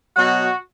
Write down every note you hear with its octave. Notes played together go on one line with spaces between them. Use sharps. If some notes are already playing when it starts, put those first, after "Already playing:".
B2 F#3 F#4